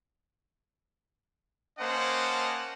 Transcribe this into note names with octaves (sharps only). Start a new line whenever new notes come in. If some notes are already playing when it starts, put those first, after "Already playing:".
A#3 C#4 C5 D#5 F#5 A5